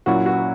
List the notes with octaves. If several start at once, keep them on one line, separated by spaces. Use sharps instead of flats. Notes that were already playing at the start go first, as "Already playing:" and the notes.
A#2 F#3 A#3 C#4 E4 F#4
F#4